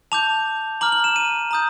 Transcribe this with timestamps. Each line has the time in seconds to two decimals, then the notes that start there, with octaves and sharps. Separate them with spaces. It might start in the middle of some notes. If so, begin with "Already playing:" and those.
0.12 A5 D6 G6 F7
0.81 A#5 D6 F6 F#7
0.92 F#7
1.04 E7
1.16 D#7
1.51 A#5 D#6 G6